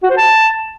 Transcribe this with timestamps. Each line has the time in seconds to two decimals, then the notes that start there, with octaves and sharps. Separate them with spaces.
0.03 F#4
0.10 C5
0.17 A5